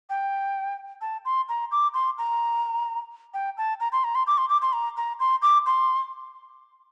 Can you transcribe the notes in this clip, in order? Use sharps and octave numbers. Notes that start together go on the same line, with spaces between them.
G5
A5
C6
A#5
D6
C6
A#5
G5
A5
A#5
C6
A#5
C6
D6
C6
D6
C6
A#5
A#5
C6
D6
C6